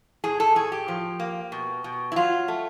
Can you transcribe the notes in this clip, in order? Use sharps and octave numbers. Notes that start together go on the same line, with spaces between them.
A2 G#4
A4
A2 G#4
G4
F3
A#3
B2
B2
E4
F#3 F4
A3